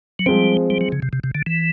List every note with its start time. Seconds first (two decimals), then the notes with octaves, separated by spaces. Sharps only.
0.19 F#3
0.26 F3 G3 G#3 C4
0.70 G3
0.81 F#3
0.92 C#3
1.02 C3
1.13 C3
1.24 C3
1.35 D3
1.46 E3